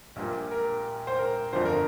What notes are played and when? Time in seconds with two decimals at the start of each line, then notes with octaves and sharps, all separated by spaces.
0.16 A#1 A#2 G3 A#3
0.51 A#4
1.07 C5
1.19 A#4
1.53 G1 F2 D3 F3 C5
1.65 A#4